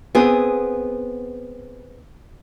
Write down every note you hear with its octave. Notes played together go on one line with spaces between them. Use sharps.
B3 C4 G#4